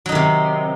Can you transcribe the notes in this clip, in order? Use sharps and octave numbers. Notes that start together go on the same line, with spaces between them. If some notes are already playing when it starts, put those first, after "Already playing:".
C3 D#3 F#3 D#4